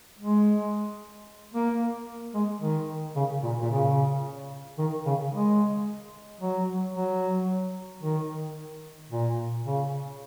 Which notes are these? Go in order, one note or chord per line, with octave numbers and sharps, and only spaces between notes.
G#3
A#3
G#3
D#3
C#3
A#2
A#2
C#3
D#3
C#3
G#3
F#3
F#3
D#3
A#2
C#3